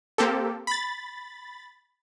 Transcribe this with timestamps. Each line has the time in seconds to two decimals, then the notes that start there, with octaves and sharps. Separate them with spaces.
0.18 A#3 C4 G4 A4
0.67 B5 A6